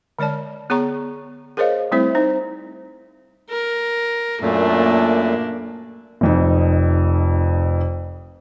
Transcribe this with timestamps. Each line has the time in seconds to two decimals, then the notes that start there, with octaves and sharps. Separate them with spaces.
0.19 D3 G#3 C#5 D5 A5
0.70 B3 G#4 C#5 A#5 C#6
1.57 G#4 A#4 C5 C#5 D#5 F5
1.92 G3 A3 C4 E4 C5 E5
2.15 D#4 C5
3.49 A#4
4.41 F#2 A#2 A3 A#3 D4
6.21 F1 F2 D#4